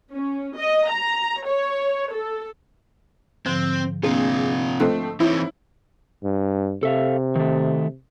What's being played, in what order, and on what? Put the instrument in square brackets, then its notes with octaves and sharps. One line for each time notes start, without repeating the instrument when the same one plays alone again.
[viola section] C#4
D#5
A#5
C#5
A4
[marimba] G#2 D3 F3 [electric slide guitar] C4
[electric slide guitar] C3 F4 [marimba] A#3 C4 D4 [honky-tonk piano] G#4
[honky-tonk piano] F3 A3 C4 [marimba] D#5 F#6
[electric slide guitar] E3 C4 [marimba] D#4 C#5 [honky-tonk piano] E4
[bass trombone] G2
[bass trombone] C3 [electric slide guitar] A4 E5 F5
[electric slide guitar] D#3 A3